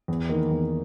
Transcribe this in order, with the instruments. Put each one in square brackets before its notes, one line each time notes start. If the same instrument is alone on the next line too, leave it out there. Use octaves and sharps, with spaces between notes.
[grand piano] E2
D#3 A#3
E2